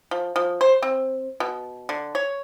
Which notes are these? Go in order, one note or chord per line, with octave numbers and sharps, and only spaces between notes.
F3
F3
C5
C4
B2
D3
C#5